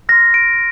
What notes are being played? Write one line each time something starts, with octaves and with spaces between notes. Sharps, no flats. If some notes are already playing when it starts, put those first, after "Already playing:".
C6 F6 A#6
D7